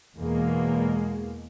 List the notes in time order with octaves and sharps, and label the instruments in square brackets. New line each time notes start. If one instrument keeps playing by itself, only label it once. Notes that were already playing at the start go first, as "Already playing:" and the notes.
[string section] E2 B2 G#3 A#3